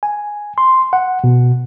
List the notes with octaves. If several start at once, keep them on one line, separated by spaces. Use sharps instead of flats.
G#5
C6
F#5
B2